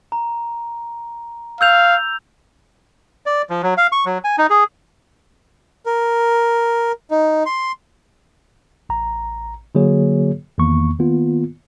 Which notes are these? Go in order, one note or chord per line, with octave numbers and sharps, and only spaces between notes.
A#5
F5 E6 G6 F7
D5
F3
F#3
F5
C#6
F#3
G#5
D#4
G#4
A#4
D#4
C6
A1 A#5
D3 F#3 A#3 F#4 G#4 C#5
E2 D#3 A#3 C#6
D#3 A#3 B3 F4